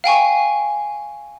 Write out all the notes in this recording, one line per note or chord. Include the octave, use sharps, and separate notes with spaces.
F5 G5 G#5 C#6